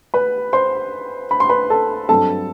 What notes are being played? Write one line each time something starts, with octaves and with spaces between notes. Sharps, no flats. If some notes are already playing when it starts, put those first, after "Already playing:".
B4 B5
C5 C6
B5
C6
B4 B5
A4 A5
G2 F#3 C4 A4 A5